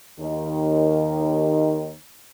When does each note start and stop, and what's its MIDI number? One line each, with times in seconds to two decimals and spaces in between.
0.20 1.94 39
0.20 1.94 51